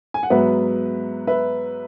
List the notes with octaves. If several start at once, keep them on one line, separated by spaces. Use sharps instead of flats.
G#5
F#5
G#2 F#3 B3 B4 E5
B4 E5